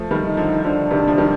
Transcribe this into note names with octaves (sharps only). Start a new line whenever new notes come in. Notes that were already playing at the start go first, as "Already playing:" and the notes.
Already playing: F3 A3
D#3 G3
D#4
D3 F3
D3 F3 D4
C3 D#3
F3
D#3 G3